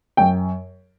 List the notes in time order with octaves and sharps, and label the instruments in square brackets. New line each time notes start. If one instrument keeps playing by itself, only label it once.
[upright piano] F#2 G5